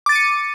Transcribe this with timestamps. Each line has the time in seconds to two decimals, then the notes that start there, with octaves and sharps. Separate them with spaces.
0.06 D6
0.09 A6
0.12 D#7
0.15 C#7